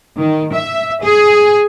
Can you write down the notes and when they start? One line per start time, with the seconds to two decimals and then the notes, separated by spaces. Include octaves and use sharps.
0.18 D#3
0.53 E5
1.04 G#4